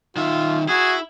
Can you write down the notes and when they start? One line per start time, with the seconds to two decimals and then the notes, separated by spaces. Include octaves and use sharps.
0.16 D#3 F4 E5
0.68 E4 F#4 G#4